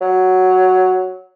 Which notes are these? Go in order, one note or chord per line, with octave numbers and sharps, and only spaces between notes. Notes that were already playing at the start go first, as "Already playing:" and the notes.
F#3